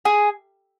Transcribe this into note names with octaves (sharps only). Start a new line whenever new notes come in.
G#4